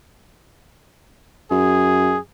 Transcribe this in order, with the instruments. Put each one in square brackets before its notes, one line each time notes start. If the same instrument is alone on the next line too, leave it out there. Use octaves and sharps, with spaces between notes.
[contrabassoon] F#2 [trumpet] G#4